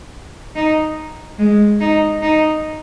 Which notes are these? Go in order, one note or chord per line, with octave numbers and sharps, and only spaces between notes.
D#4
G#3
D#4
D#4